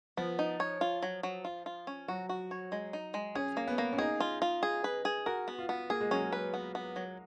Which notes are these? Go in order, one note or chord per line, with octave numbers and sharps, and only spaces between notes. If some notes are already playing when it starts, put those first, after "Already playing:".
F3 B3
D#4
C#5
F4
F#3
F#3
F4
F4
C#4
F#3 F#4
F#4
C#5
G#3
D#4
G#3
C#4 G#4
A#3
B3
A#3
C#4
D#4 G#4
F4
F4
G#4
B4
G#4
F#4 A#4
B3
F4
B3
A#3 G#4
G#3
F#3 C#4
G#3
B4
B3
B3
F#3